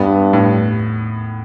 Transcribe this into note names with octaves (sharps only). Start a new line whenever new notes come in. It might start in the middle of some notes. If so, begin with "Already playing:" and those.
Already playing: G2 B3
A2